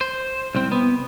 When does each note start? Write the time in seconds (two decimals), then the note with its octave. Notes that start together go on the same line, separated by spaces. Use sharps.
0.01 C5
0.55 C2 C4
0.72 B3